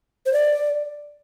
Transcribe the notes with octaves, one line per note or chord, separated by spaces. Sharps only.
C5
D5